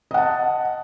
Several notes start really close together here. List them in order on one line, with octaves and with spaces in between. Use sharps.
D#5 F#5 A5